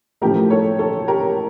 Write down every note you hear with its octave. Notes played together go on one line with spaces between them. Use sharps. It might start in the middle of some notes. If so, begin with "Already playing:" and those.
A2 F3 A3 G4 A#4
A4 C#5
A4 C#5
G4 A#4